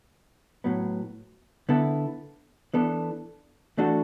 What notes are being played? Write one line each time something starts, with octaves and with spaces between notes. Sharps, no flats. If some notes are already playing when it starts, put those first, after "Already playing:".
A2 F#3 B3
D3 B3 E4 A4
E3 B3 D4 A4
E3 A3 D4 F#4 A4